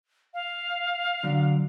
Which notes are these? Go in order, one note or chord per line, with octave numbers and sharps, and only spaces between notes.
F5
D3 F#3 D4